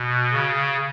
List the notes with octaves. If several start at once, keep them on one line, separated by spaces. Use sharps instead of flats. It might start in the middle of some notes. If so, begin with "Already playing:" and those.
Already playing: B2
C#3